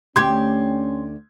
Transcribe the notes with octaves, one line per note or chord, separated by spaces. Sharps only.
D2 C#4 G4 C6 G#6